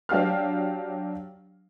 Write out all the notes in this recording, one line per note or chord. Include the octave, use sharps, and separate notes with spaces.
F#3 D4 G4 F5 F6